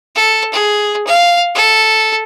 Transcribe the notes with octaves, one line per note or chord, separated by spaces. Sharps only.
A4
G#4
F5
A4